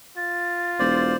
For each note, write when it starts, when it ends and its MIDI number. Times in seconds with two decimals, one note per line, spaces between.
0.17 1.14 65
0.17 1.03 93
0.79 1.14 28
0.79 1.17 72
0.79 1.17 74